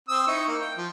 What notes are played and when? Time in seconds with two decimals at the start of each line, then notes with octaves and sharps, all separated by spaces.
0.08 C4 D#6 E6
0.27 D#4 E4 C#6
0.48 A#3
0.61 G5
0.77 F3